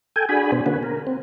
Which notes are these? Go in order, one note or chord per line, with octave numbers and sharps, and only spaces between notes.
A4 G5 G#5
D4 F#4 G#4 G#5 B5
B2 B3 D4 C5
D3 A#3 B3 C#4 F#4 B4
A#4
C4